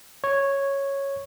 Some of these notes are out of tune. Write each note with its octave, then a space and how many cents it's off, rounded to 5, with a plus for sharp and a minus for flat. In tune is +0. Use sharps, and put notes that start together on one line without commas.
C#5 -5